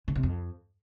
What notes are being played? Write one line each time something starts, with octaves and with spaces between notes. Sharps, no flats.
C#3
C3
F2